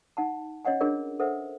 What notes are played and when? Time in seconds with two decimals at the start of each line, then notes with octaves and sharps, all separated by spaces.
0.17 D#4 F#5 A5
0.65 C#4 C#5 D#5 F#5 G#5
0.80 D4 F4 G#4 A#4 C#5 D#5
1.20 A4 A#4 C5 E5 F#5